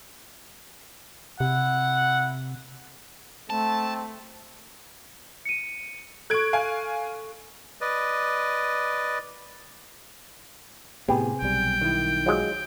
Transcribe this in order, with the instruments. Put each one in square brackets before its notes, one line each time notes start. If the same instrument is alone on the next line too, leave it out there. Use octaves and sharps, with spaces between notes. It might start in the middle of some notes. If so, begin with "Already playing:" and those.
[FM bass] C3 [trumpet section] E4 F#5
[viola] A3 [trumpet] C4 [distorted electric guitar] A5
[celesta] C#7 D#7
[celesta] A4 C#6 [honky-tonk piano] F#6 G#6 D7
[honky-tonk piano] F5 G#5
[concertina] B4 D5 D#5
[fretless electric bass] A2 B3 [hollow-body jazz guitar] C3 G#4 [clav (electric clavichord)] G4 B4
[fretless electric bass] B1 G3 [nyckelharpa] G5
[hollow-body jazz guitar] D#3 E4
[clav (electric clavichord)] F3 F#3 G#3